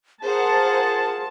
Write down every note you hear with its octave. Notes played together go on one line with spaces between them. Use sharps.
F4 G#4 A#4 C5 F#5 A5